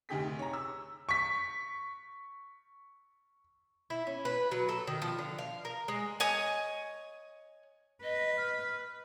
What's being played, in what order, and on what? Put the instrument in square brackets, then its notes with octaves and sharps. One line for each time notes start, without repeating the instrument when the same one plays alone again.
[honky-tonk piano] F1 D2 D#4 G4 G#4 B6
C#5 A#5
E6
[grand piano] C#6 B6
[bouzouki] E4
C#4
B4
F#3
A4
D#3
F3
D3
F5
A#4
G#3
[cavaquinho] C#5 D#5 G#5 D#6
[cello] B4 [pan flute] D#5
[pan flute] F6